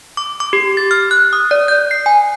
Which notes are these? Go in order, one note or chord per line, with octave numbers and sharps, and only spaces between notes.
D6
D6
G4
A6
F6
F#6
D#6
D5
G6
C7
G#5